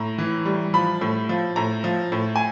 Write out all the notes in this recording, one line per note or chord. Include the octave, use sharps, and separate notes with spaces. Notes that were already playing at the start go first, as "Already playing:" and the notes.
Already playing: A2 A#5
E3
G3
F3 B5
A2
F3
A2 A#5
F3
A2
G#5